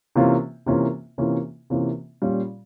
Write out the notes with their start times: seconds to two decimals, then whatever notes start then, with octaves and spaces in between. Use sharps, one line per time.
0.15 C3 E3 A#3 C#4 F4
0.66 C3 E3 A#3 C#4 F4
1.18 C3 E3 A#3 C#4 F4
1.70 C3 E3 A#3 C#4 F4
2.22 A#2 G3 C#4 F4